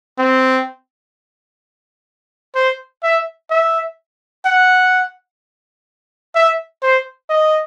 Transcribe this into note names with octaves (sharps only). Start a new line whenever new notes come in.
C4
C5
E5
E5
F#5
E5
C5
D#5